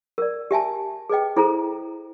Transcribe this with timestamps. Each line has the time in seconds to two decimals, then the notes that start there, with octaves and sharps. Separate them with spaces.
0.18 A#4 D5
0.51 G4 E5 G#5 A5
1.10 G#4 B4 D#5 G5
1.37 E4 G#4 A4 C5 A#5